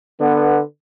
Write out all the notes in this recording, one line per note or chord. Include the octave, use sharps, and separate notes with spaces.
D3 B3